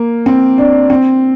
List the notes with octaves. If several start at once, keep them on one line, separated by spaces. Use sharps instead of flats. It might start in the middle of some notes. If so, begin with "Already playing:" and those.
Already playing: A#3
C4
D4
C4